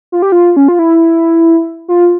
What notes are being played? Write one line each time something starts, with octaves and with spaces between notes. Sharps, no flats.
F4
G4
F4
C#4
F4
E4
F4